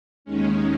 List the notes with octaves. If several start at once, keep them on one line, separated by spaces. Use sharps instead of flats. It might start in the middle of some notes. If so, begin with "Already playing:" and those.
D#2 D#3 G#3 C#4